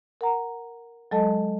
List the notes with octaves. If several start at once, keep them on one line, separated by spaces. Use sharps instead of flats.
A#4 F#5 A#5
F#3 G#3 A4 D#5 A5